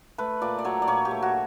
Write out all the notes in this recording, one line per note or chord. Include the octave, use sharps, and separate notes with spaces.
A3 B4
A#2 D5
D5
F#3 C#5
D5
A#2 C#5
G4
A3
F#4